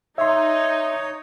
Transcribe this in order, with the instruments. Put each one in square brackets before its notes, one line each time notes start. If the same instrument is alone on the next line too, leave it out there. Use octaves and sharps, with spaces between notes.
[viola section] D#4 D#5 [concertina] C#5 [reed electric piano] E5 C6